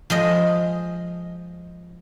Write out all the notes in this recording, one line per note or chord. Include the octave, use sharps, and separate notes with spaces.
F3 G#3 D#5